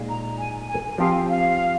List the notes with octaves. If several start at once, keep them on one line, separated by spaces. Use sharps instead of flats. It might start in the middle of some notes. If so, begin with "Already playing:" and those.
Already playing: A#2 G#3 D#4 G#4
A#5
G#5
G#5
F3 C4 G4 F5
F5